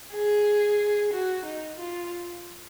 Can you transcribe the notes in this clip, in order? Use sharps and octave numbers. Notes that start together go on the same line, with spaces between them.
G#4
F#4
D#4
F4